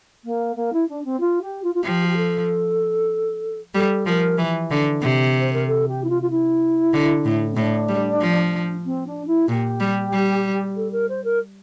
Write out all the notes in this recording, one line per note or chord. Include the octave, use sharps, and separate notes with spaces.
A#3
A#3
E4
D4
C4
F4
G4
F4
F4
F3 G4
G4
A4
G3 A4
F3 A#4
E3
D3
C3
C5
A#4
A4
G4
E4
F4
F4
E4
D3
A2
C4
A2 D4
G3
F3
C4
D4
E4
A#2 G4
G3
G3
A4
A#4
C5
A#4